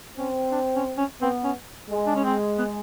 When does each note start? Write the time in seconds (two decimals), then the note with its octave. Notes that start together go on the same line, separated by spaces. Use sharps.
0.18 C4 C#4
0.52 D4
0.76 C#4
0.98 C#4
1.21 B3 C4
1.44 C#4
1.90 G#3
2.07 D4
2.15 C#4
2.24 C4
2.59 B3